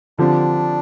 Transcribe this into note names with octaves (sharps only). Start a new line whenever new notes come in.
D3 F3 C4 D4 G4